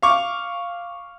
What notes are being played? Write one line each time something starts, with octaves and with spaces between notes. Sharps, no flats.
F5 C#6 D6